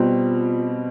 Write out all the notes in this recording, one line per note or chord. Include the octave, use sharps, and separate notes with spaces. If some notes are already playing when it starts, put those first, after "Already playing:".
Already playing: B2 G3 C4 F4